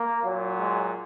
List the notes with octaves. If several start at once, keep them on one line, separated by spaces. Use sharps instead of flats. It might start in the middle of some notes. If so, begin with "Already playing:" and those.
Already playing: A#3
A#2 F#3
G#3